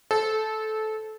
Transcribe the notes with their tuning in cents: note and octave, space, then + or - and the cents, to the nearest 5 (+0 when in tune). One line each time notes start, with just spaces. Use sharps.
A4 -15 C5 -15